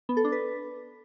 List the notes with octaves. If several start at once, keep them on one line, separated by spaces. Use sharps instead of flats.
B3
A4
D4
B4